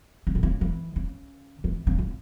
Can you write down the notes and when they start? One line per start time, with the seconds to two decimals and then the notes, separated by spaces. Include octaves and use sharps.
0.27 C#3
0.35 B2
0.43 C#3
0.61 E3
0.96 C#3
1.64 E3
1.87 C#3
1.99 C#3